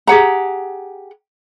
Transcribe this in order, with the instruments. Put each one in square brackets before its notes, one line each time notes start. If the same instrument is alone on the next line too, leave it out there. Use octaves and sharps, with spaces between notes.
[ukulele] G4 G#4 F#5 A#5